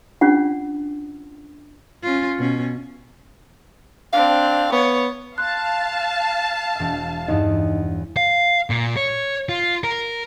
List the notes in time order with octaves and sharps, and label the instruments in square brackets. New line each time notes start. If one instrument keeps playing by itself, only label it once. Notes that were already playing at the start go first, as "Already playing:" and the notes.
[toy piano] C#4 D4 F4 F#5
[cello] C#4 F4
B2 C#4
[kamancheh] C4 D4 [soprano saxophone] F5
[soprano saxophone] B3 [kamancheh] C#5
[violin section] F5 A5 [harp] C6 [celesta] F#6
[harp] E1 E5
[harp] E2 G2 [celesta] D#4 D#5
[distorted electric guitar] F5
A#2
C#5
F4
A#4